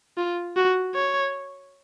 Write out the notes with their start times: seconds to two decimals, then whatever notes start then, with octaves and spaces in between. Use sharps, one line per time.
0.18 F4
0.56 F#4
0.95 C#5